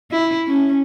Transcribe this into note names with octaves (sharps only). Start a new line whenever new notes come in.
E4
C#4